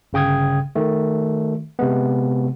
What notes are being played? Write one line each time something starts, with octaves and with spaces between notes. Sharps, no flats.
G1 C#3 G5 D#6 G#6
D#3 A3
C3 G#3 B3